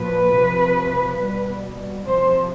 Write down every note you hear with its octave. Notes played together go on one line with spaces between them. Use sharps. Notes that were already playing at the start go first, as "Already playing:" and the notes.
Already playing: A#2 F3 B4
C3 F3
B2 G3
C3 F3 C5